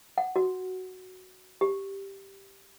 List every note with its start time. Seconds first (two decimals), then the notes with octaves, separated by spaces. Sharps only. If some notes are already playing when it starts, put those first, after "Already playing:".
0.18 F#5
0.36 F#4
1.61 G4